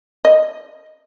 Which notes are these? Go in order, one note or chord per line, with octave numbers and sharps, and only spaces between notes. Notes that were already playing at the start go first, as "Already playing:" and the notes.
D#5